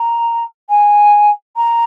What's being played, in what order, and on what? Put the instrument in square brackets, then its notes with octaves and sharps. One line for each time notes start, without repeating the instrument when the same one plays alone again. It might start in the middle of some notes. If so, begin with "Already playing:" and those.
Already playing: [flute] A#5
G#5
A#5